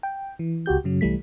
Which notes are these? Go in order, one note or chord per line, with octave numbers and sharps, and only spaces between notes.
G5
E3
C#2 F#4 G4 G6
F#2 C#3 F#3
C2 E3 G3 A3 B6